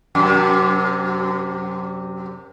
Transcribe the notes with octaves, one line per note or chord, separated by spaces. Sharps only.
F#2 C3